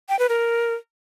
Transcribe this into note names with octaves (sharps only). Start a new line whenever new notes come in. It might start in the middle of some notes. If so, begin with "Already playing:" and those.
G5
B4
A#4